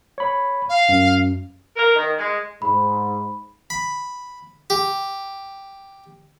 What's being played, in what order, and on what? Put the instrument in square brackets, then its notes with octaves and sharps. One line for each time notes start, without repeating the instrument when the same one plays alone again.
[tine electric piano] C#5 B5
[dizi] F5
[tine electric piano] F#2
[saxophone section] A#4
D#3
G#3
[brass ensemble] G#2 [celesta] B5
[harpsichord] B5
G4